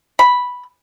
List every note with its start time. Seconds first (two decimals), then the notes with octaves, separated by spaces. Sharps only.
0.19 B5